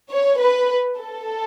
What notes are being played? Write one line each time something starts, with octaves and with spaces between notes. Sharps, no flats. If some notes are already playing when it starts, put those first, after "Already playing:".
C#5
B4
A4